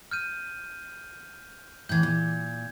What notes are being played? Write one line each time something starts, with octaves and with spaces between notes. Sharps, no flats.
F6 G6 D#7
A2 E3 G6 G#6
A#2